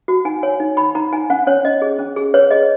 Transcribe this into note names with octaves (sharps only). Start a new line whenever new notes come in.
F#4
D#4 G#5
C#5 G#5
D#4
D#4 B5
D#4 A#5
D#4 G#5
C#4 F#5
C#4 C#5
C#4 D#5
G#4
C#4
G#4
B4 C#5
G#4 D#5